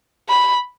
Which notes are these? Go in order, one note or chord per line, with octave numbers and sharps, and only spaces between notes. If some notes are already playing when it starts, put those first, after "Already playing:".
B5